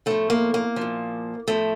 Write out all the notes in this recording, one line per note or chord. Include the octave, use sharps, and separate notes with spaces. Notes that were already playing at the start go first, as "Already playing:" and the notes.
A2 F3 A3
A#3
A#3
F3
A#2
A2 F3 A3